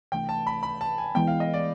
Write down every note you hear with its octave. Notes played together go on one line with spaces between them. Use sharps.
C3 E3 A3 D4 G5
A5
B5
B5
A5
G#5
E3 G#3 B3 G5
F5
D#5
D5